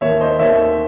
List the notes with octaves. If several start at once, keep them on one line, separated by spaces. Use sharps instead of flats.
D#2 D#3 C#5 E5
C5 D#5
D#2 D#3 C#5 E5